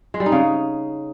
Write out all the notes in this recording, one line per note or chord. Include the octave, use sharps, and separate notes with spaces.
G#3
G3
D#4
C#3